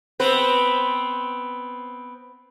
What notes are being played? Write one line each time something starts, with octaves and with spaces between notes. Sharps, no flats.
B3 C4 B4